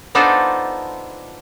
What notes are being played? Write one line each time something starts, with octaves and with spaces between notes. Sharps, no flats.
B3 D4 D#4 F4 A4 C5